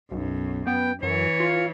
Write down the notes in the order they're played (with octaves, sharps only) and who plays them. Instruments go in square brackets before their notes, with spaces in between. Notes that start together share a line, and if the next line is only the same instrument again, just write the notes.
[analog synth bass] B1 [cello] F#2
[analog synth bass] B3 [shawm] G5
[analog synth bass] F#2 [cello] E3 [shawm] C#5
[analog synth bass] F4